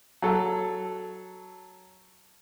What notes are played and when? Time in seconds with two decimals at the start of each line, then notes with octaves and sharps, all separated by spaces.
0.22 F#3 A4